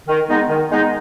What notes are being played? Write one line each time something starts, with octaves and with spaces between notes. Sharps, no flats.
D#3
G#3 B3 D#4
D#3
G#3 B3 D#4